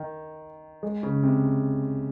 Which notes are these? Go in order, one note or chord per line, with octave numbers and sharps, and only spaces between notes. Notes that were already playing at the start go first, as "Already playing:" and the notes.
Already playing: D#3
G#3
C#3
C3